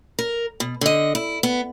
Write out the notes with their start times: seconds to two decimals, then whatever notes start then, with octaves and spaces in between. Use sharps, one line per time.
0.19 A#4
0.60 B2
0.81 D3 D#5
1.15 E4
1.43 B3